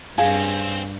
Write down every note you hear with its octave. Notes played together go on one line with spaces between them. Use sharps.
G2 C4 C#4 G#4 F5